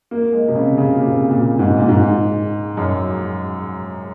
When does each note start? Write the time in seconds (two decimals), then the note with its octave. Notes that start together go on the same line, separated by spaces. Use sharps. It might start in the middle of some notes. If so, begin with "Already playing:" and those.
0.11 A#3
0.33 G#3
0.48 C3
0.55 C#3
0.78 C#3
0.95 A#2
0.99 C3
1.30 A#2
1.59 G#2
1.77 A#2
1.88 G#2
2.77 F#2